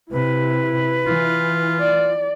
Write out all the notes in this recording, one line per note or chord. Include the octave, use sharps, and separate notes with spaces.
C3 E4 B4
E3 F4
D5